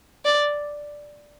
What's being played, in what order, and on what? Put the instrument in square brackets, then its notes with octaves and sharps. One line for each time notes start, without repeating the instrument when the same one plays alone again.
[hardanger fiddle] D5